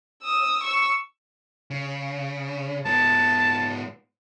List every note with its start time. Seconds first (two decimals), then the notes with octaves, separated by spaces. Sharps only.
0.23 D#6 E6
0.63 C#6 E6
1.70 C#3
2.85 G#2 B3 A5